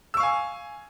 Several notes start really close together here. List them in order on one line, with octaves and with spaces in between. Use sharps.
E6 C#6 F5 G#5